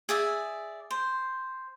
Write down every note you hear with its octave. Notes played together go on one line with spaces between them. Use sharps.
G#4 D5 E5
C5